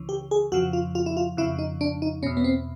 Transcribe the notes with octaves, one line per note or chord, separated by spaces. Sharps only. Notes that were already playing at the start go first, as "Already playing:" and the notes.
Already playing: C#2 C#3 E3
G4
G#4
F2 C#3 F3 F#4
F4
F4
E4
F4
F2 C#3 F3 E4
D#4
D4
D#4
E2 B2 C#4
B3
C4